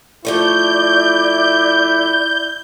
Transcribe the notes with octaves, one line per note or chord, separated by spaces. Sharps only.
F3 A3 E4 C#5 D5 G6